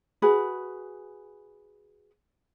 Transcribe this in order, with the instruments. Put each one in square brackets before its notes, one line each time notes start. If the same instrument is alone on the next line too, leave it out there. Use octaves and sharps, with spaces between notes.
[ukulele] F#4 G#4 B4